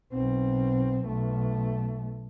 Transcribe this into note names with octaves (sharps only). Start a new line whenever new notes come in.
B1 C4
B1 A3